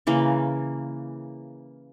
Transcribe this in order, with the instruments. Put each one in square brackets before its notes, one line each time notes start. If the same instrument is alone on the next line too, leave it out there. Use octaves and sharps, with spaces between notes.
[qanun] C#3 E3 A#3